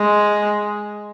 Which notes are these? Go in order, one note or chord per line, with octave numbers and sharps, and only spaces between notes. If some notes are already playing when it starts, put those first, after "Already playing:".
Already playing: G#3